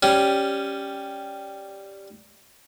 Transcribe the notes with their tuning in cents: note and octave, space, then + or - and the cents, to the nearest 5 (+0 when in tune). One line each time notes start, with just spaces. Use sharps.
G3 +0 C#4 +0